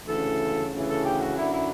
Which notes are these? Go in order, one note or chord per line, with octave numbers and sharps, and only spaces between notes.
D2 C#3 E3 A4
D2 C#3 E3
A4
G4
F#4
F#2 D3 E4
E4